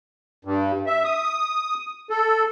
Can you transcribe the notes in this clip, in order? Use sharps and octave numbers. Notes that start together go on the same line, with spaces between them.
G2
E5
D#6
A4